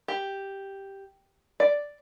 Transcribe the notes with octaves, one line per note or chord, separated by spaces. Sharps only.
G4
D5